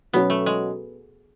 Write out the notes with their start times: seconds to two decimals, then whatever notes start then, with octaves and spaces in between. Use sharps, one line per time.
0.13 B2 F#3 B3 C#4 F#4
0.30 A3
0.46 G#3